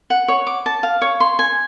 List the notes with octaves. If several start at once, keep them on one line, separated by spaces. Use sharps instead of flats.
F#5
C#5
D6
A5
F5
C#5
C6
G#5